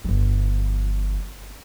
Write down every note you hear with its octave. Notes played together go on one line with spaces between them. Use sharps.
G1 F3